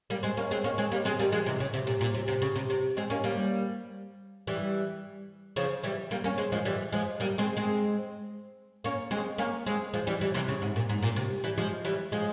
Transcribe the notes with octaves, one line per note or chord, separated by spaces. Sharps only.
G3 A#3
G#3 C4
A#3 C#4
G#3 C4
A#3 C#4
G#3 C4
G3 A#3
G#3 C4
G3 A#3
F3 G#3
C3 E3
C#3
C3
A#2
A#2
C3
C3
C#3
C3
C3
G#3 C4
A#3 C#4
G3 A#3
E3 G3
C#3 F3
E3 G3
G3 A#3
A#3 C#4
G#3 C4
F3 G#3
E3 G3
F3 G#3
G3 A#3
G#3 C4
G#3 C4
A#3 C#4
G#3 C4
A#3 C#4
G#3 C4
F3 G#3
E3 G3
E3 G3
C3 E3
C#3
G#2
A#2
G#2
A#2
C3
E3 G3
F3 G#3
E3 G3
F3 G#3